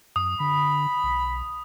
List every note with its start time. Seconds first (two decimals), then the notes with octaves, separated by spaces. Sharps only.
0.16 F#2 D#6
0.40 D3 B5
1.03 B1